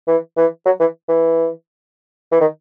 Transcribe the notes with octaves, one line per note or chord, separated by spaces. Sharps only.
E3
E3
F#3
E3
E3
E3
D#3